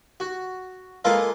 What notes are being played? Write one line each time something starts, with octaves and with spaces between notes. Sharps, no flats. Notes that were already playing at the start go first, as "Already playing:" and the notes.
F#4
G#3 A#3 F4 A4 B4 F5